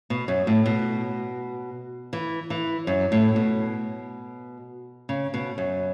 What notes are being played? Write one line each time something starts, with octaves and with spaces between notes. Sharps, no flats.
B2
F#2
A2
B2
E3
E3
F#2
A2
B2
C#3
B2
F#2